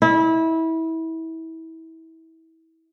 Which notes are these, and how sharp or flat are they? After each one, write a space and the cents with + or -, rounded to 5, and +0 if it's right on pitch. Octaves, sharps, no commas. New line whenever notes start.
E4 -25